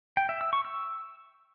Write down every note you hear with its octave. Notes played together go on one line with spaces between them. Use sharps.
G5
E5
E6
C#6
E6